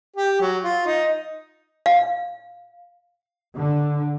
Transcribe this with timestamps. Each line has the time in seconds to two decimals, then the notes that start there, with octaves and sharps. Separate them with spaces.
0.16 G4
0.41 F#3
0.64 F4
0.86 D#4
1.86 F5
3.57 D3